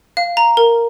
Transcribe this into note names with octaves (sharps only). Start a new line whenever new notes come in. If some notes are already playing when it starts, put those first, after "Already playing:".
F5
A#5
A#4